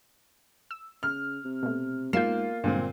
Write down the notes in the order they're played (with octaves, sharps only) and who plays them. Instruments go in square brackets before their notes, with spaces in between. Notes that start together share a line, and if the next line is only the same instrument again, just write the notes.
[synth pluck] E6
[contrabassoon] C#3 [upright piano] F6
[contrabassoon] C3
[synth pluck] B2 A3
[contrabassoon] G#2 [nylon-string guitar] A#3 [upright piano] F4 C7 [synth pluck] G6 E7
[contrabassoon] B1 [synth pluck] G2 D3 G#3 [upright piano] A#2 C4